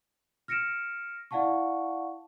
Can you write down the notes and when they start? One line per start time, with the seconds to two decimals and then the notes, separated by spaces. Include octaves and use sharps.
0.48 F6 A#6 C#7 D7 E7
1.31 E4 D5 F5 F#5 A5 C#6